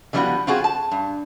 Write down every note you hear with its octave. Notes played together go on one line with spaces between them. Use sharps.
D3 F3 G3 B3 E4 F#4
C4 F4 F#4 G#4
A5
G2